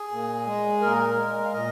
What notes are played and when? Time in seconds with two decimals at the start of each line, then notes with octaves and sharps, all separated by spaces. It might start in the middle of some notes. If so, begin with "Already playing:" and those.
Already playing: G#4
0.11 A#2
0.46 G#3
0.82 A#2 A#4
1.17 G#3
1.45 F5
1.53 A#2 D#5